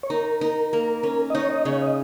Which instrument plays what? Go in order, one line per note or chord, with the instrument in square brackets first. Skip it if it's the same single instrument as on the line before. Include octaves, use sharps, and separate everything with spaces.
[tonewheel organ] C#5
[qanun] D#4 [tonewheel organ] A#4
[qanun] D#4
A#3
C#4
[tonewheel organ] D#5
[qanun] D#4 [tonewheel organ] C#5
[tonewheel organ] D#5
[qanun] C#3 [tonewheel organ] C#5
[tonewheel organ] D#5